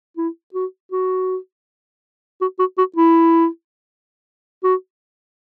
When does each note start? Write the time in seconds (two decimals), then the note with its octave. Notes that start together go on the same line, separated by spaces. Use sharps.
0.17 E4
0.54 F#4
0.92 F#4
2.41 F#4
2.59 F#4
2.78 F#4
2.96 E4
4.63 F#4